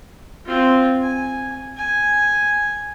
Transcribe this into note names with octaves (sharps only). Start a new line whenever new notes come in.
C4 F4
G#5
G#5